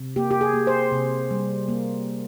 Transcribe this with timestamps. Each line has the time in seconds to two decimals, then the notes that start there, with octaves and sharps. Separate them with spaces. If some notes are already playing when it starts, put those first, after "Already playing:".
Already playing: C3
0.16 A#3 G4
0.31 G4
0.41 G#4
0.54 A#3
0.67 C5
0.92 C3
1.31 G3
1.68 A#3